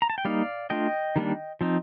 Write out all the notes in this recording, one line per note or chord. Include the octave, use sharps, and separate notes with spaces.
A#5
A5
G5
G3 A#3 D#4 D5 F5
A3 D4 F4 D#5 G5
D#3 G3 A#3 D4
F3 C4 D#4